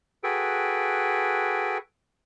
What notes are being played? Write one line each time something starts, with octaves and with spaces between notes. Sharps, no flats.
F#4 G#4 A4 B4 G5